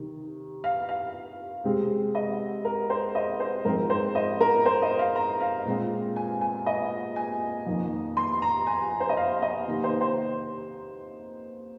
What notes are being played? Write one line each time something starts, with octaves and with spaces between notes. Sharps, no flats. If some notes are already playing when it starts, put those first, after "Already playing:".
Already playing: C3 D#3
F5
F5
C3 G#3 C4
D#5
A#4
C5
D#5
C5
G#2 F3 G#3 C4 A#4
C5
D#5
A#4
C5
D#5
F5
A#5
F5
A#2 G#3 C4
G#5
G#5
D#5
G#5
F2 D#3 A#3
C6
A#5
G#5
C5
D#5
F5
D#5
C3 D#3 A#3
C5
C5